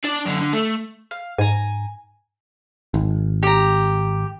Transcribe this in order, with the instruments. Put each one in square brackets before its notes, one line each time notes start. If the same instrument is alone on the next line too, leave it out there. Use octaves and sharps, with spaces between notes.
[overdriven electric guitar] D4 D5
F#2 D3
D3
A3
[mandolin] F5
[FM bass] G#2 [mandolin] G#5 A#5
[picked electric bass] G#1
[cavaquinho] G4 A#5